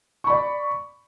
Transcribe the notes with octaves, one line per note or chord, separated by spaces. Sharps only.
D5 B5 C#6